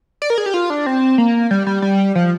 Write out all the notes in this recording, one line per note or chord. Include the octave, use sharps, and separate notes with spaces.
D5
A#4
G#4
G4
F4
D4
C4
A#3
G3
G3
G3
F3